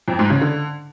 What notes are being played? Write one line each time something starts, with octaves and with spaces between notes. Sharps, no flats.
F2
G#2
C#3
D3